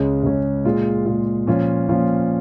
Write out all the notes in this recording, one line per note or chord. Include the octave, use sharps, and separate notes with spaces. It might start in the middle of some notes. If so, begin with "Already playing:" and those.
Already playing: C#2 C#3 G#3 C#4
C#2 C#3 G#3 C#4
A#2 G#3 F4
A#2 G#3 F4
A#2 F3 C#4 F4
A#2 F3 C#4 F4